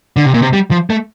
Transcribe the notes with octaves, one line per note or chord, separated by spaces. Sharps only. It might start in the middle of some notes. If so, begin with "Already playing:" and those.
D3
C3
A#2
C3
G3
F3
A3